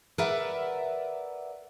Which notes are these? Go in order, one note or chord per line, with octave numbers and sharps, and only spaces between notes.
A#4 B4 D5 E5 F#5